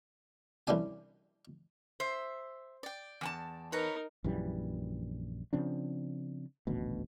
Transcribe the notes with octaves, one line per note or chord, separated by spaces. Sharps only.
C2 E3 C#4 D4 G#5
C5 E5
D5 G5
E2 G#5 A5
D#4 A#4 B4 C#5 A#5
A#1 F#2 E3 G3
C#3 F3 C4 D4
D#1 A1 D2 B2